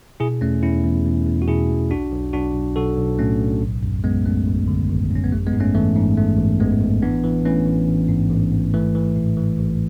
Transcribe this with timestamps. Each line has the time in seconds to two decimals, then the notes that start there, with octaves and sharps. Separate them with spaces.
0.20 B2 E4 G#4
0.41 E2 A3 C#4
0.63 E2 C#4 E4
0.84 E2
1.05 E2
1.27 E2
1.42 F#4
1.48 B2 E4 G#4
1.70 E2
1.91 B1 D4 F#4
2.12 B1
2.33 B1 D4 F#4
2.54 B1
2.76 B1 F#4 A4
2.97 B1
3.19 A2 A3 C#4
3.40 B1
3.62 G#1
3.83 F#2
4.04 F#2 G#3 B3
4.25 F#2 A3
4.47 G#1
4.68 D3
4.89 G#1
5.11 F#2 C#4
5.24 B3
5.32 A1 A3
5.47 G#3 B3
5.54 G#2
5.60 A3 C#4
5.75 E3 A3
5.96 G#2
6.17 A1 A3
6.39 A1
6.60 A1 G#3 B3
6.81 A1
7.02 E3 B3 D4
7.24 E3
7.45 E3 A3 C#4
7.67 A1
7.88 A1
8.09 G#2
8.30 A1
8.52 G#2
8.74 E3 A3
8.95 E3
9.16 A2
9.37 E3
9.58 A1